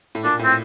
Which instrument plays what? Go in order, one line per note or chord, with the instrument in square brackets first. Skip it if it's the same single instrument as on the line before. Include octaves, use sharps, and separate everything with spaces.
[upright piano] A2
[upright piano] A#2 [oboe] D4
[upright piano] A2 [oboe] C4